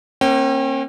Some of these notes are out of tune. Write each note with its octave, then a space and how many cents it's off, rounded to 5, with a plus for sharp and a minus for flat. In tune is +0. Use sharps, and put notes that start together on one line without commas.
A#3 +0 C#4 -45 G5 -25